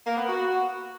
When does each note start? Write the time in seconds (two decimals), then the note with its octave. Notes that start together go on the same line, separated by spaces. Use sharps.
0.06 A#3
0.17 B3
0.28 F#4